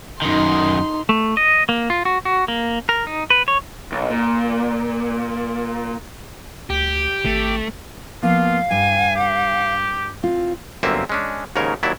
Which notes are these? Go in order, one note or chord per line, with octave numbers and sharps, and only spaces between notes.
F#2 D#3 D#4 C6
A3
D#5
A#3
F4
F#4
F#4
A#3
A#4
D#4
B4
C#5
B1
A#2
D2 G4
G#1 A3
F3 A#3 B3 F4 F5
G2 G5 G#5
G4
C4 F4
G1 F#2 A#3 C4 E5
G#3 C#4 D4
D#2 G#2 C#3 A#4 C#5
D#2 F#3 E4 D5 E5